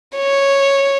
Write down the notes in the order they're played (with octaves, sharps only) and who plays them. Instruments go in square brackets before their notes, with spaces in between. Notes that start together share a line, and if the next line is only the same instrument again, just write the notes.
[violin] C#5